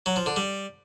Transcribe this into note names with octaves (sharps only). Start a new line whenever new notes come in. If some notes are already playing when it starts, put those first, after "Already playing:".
F#3
F3
D3
G3